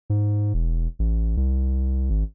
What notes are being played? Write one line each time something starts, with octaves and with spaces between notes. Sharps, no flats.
G#2
E1
A1
C2
G#1